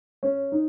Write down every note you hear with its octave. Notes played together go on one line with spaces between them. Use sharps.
C#4
D#4